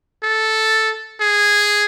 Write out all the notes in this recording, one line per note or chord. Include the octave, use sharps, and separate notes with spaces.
A4
G#4